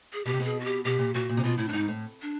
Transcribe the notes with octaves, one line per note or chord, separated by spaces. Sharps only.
G#4
B2 G4
C3
B2
G#4
F#4
G4
B2 G4
A#2
A#2 F#4
A#2
C3
B2 F4
A2 E4
A2 D4
G#2 D#4
A2
D4